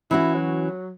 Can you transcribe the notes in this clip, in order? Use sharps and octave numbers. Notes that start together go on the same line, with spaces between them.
E3 C#4 E4 F#4
F#3